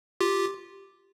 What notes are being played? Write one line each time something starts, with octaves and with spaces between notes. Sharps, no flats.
F4 G4